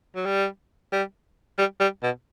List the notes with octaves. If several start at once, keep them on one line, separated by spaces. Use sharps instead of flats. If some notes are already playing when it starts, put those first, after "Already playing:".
F#3
G3
G3
G3
G3
B2